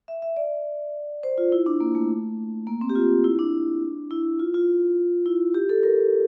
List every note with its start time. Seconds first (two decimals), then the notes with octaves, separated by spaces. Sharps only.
0.08 E5
0.22 E5
0.37 D5
1.23 C5
1.38 F4
1.52 E4
1.66 D4
1.80 A#3
1.95 A3
2.67 A#3
2.81 C4
2.90 G4
2.96 F4
3.24 E4
3.39 D4
4.11 E4
4.40 F4
4.54 F4
5.26 E4
5.55 G4
5.69 A4
5.83 A#4